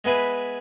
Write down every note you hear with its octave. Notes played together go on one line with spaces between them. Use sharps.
G#3 B3 E4 G#4 B4